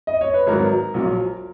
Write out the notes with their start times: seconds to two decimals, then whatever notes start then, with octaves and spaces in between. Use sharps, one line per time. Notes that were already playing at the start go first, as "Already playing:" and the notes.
0.07 D#5
0.21 C#5
0.34 B4
0.47 G#1 G#2 F#3 A#4
0.94 A#1 A#2 F#3